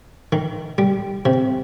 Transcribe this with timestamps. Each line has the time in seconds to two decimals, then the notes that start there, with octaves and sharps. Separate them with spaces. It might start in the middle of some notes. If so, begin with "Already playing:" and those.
0.32 D#3
0.78 G3
1.25 C3